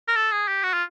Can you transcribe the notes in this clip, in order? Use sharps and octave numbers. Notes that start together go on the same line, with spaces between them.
A#4
A4
G#4
G4
F#4
F4